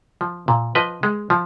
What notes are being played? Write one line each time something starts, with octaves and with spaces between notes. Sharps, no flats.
F3
A#2
F3 B4 D#5
G#3
F3